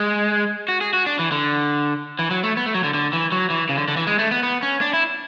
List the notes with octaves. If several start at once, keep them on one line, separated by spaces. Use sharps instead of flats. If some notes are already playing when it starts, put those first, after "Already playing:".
Already playing: G#3
F#4
G#4
F#4
D4
E3
D3
E3
F#3
A3
B3
A3
F#3
D3
D3
E3
F#3
E3
C#3
D3
D3
E3
G#3
A3
B3
B3
C#4
D4
E4